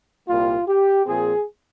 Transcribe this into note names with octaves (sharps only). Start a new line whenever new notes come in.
C2 A#2 G3 A#3 F4
G4
A#2 F3 C4 G#4